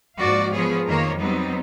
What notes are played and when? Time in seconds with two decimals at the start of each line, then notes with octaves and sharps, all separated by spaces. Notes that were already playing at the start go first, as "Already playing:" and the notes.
0.19 G#2 F3 A#3 F#4 D5 F5
0.53 F3 B3 G#4 C#5
0.86 F2 D#3 F3 A#3 A#4 C#5
1.19 F#3 G3 B3 C4 D#4